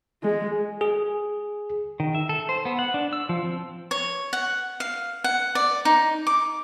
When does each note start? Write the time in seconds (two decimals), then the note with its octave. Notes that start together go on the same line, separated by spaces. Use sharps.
0.22 G#3
0.81 G#4
2.00 D#3
2.15 E5
2.29 A4
2.49 C5
2.65 B3
2.79 F#5
2.94 D4
3.13 E6
3.29 F3
3.43 C4
3.91 C#5
4.33 F#5
4.80 F5
5.24 F#5
5.55 D5
5.85 D#4
6.27 D6